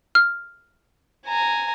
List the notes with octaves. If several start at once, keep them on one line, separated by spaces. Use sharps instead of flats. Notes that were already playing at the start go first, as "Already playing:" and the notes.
F6
G#5 A#5